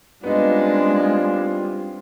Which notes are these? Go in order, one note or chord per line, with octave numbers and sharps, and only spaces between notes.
G3 G#3 B3 C4 D4 D#4 F4